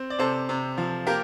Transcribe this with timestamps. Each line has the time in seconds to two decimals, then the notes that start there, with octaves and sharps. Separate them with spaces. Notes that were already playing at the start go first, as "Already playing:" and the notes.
Already playing: C4
0.10 D5
0.19 C3 A4 C5
0.49 C3
0.78 F3
1.07 A#3 G4 A#4